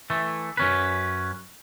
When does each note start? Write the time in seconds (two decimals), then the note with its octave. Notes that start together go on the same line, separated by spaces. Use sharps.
0.10 E3 A3
0.57 F#2 C#4 B4